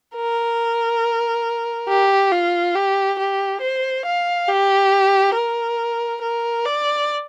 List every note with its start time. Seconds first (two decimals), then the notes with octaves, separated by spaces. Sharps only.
0.16 A#4
1.88 G4
2.31 F4
2.75 G4
3.19 G4
3.61 C5
4.05 F5
4.48 G4
5.35 A#4
6.22 A#4
6.65 D5